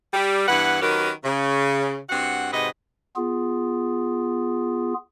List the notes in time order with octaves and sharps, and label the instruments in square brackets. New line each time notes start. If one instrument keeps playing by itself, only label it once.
[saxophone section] G3
G2 E3 B3 B4 F#5
D#3 F#3 C#4 G4 A#4 B4
C#3
G2 C4 F#4 F#5
G#2 C3 F#4 B4 D#5
[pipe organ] B3 F4 G#4